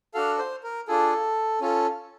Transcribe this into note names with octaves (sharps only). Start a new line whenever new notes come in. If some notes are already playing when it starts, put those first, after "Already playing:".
D4 F#4 A4 F5
C5
A#4
D4 F4 G#4 A4
C#4 F4 A4